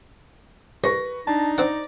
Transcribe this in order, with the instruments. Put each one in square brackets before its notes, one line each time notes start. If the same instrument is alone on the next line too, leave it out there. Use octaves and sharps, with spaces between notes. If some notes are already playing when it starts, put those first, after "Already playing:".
[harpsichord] C2 [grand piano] B4 C#6 A#6
[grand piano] D4 [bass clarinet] D#4 [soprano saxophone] A5
[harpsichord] C4 C5 F#5 [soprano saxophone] D5